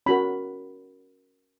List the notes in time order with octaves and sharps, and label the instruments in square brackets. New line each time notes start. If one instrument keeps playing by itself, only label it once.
[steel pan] C#4 F#4 A#4 B5